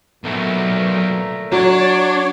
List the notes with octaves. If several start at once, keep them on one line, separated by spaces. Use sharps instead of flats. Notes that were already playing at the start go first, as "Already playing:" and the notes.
B1 A#2 F#3 A3 A#4
F#3 D4 C#5